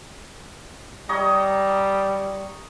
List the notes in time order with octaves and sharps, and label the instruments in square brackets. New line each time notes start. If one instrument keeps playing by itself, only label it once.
[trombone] G3 [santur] C#5 D#5 A#5